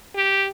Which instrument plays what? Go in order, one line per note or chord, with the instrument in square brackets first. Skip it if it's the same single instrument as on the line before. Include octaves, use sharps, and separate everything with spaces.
[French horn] G4